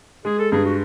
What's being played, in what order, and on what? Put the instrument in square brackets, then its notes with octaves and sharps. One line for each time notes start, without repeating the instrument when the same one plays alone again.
[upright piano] G#3 [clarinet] G#4
[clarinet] A4
[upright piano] G2 [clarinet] G#4
[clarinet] F#4